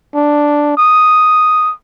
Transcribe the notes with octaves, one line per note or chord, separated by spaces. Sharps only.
D4
D#6